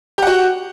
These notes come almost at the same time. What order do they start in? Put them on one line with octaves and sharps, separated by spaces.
G4 F#5 F#4